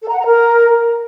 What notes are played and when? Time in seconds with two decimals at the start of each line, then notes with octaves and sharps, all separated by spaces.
0.02 A4
0.08 A#5
0.14 F#5
0.20 A#5
0.25 A#4